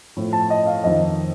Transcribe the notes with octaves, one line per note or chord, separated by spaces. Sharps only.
A2 F3
A5
D#5
F5
F2 D#3 D#5